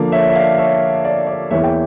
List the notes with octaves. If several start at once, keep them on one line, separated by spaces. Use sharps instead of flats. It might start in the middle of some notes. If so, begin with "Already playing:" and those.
Already playing: D3 F3 A#3 D4 D5
C#5 E5
E5
D5 F5
C#5 E5
D5
D5
E2 E3 A#3 C#5 E5
G5